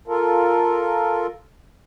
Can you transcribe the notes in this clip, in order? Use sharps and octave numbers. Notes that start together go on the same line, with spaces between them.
F4 A4 A#4